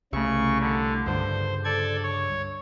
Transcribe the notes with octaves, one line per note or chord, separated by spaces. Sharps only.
C2 C#3 A3 C#6
D3
C#2 G2 D3 C5
A4 D5 G#6
C#5